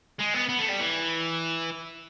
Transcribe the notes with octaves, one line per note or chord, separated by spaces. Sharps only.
G#3
B3
B3
A3
G3
E3